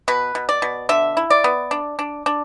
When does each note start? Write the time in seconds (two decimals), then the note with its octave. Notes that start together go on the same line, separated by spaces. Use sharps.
0.08 B2 B4
0.35 B2
0.49 D5
0.62 B2
0.89 D3 E5
1.17 E4
1.30 D5
1.44 B3
1.71 D4
1.99 D4
2.26 D4